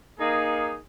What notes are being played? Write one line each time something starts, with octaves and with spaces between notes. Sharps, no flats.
A#3 D#4 G#4